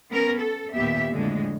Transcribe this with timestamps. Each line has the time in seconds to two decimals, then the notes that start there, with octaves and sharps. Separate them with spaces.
0.11 B3 C#4 A#4
0.40 A4
0.74 D#2 A#2 B3 G4 E5
1.11 F2 A2 D3 G#3